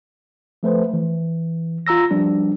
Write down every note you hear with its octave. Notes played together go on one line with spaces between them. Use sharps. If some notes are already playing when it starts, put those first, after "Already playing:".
F3 A3 B4 C5
E3
F4 A#5 E6 A#6
F3 G3 D4